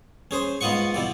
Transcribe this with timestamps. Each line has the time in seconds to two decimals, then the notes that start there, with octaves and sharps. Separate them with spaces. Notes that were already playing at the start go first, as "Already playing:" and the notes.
0.31 C#4 G#4 C5
0.61 G#2 B3 F4 D#5 F#5 C#6
0.94 B2 E3 D5